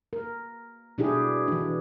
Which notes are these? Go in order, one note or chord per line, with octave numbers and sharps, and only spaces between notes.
A#4
B2 D4 E4 G4 G#4
E3 D4